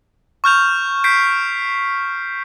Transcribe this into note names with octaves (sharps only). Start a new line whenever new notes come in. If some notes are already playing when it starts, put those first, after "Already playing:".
C#6 F6 G6 F7
G6 B6 C7 D7